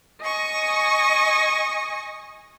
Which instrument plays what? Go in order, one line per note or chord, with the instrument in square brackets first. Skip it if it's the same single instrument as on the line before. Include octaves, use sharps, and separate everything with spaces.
[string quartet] D#5 G#5 C#6